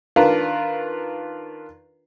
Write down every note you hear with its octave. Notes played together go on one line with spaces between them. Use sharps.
D#3 D4 F4 A#4 B4